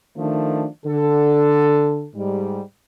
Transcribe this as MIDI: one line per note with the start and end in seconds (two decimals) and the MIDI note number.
0.17 0.67 51
0.17 0.67 53
0.17 0.67 57
0.17 0.67 62
0.86 2.07 50
0.86 2.07 69
2.15 2.62 44
2.15 2.62 55